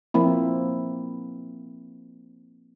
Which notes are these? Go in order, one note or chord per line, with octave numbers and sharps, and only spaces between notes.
F3 A#3 C4 E4